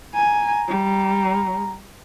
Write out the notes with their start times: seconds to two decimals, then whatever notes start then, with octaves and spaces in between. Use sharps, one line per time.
0.15 G#5 A#5
0.69 G3